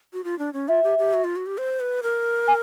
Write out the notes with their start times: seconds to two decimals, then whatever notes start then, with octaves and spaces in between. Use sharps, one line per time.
0.13 F#4
0.24 F4
0.39 D4
0.53 C#4
0.68 F4 E5
0.84 G4
0.98 G4
1.14 F#4
1.24 F4
1.36 F#4
1.46 G4
1.58 C5
1.80 B4
2.03 A#4
2.47 G#5